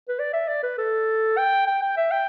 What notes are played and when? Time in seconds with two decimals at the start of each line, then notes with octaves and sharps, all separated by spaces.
0.09 B4
0.19 D5
0.34 E5
0.48 D5
0.63 B4
0.78 A4
1.38 G5
1.67 G5
1.82 G5
1.97 E5
2.11 G5